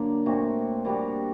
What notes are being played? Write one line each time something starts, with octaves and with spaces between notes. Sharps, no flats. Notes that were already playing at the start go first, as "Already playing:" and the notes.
Already playing: D3 F#3 A#3
A#2 A3 C4 F#4
A#2 G3 D4 F#4